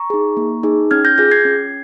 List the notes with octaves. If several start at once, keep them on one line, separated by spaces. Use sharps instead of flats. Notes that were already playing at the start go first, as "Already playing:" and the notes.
Already playing: A#5 C#6
D#4 G#4
A#3
D#4 G#4
C#4 F6 G#6
G6 A#6
F4 G#4 G6 A#6
G#6 C7
C#4